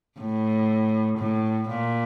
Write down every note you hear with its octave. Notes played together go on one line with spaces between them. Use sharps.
A2
A2
A#2